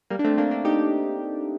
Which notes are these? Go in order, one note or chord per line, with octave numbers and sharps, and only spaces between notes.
G3 A#3
D4
A3 C4
A#3 D4
A#3 D4
D#4 G4